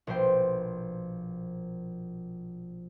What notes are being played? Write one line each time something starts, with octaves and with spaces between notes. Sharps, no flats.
A#1 B2 F3 C5 G5